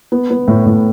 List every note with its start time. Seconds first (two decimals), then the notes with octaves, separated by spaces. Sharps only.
0.12 B3
0.30 B3
0.48 A2
0.66 A2